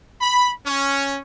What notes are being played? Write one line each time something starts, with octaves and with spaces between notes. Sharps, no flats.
B5
C#4